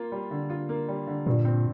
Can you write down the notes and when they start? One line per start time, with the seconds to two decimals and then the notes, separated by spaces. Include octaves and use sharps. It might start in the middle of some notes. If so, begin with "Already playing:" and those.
Already playing: A#3 F4
0.12 G3
0.31 D3
0.50 F4
0.69 A#3
0.88 G3
1.07 D3
1.26 G2 A#2
1.45 C4